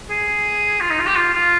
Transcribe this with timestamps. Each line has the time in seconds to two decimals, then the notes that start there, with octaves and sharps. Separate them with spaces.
0.10 G#4
0.81 F4
0.90 D#4
0.99 F4
1.07 G4
1.16 F4
1.34 F4